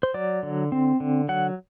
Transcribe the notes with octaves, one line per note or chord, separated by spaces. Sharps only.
C5
F#3 D5
D3
C4
D3
F#3 F#5